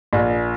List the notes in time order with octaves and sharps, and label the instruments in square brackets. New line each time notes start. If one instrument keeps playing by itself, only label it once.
[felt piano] A#1